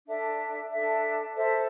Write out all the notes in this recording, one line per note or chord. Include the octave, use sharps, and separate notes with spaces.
D4 A4 E5
D4 A4 E5
A4 C5 E5